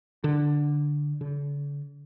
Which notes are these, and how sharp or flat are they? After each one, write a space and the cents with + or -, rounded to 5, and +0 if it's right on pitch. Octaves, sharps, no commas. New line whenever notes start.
D3 +0
D3 -40